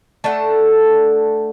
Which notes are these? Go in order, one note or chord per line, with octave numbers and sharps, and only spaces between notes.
A3 D4 A4 F#5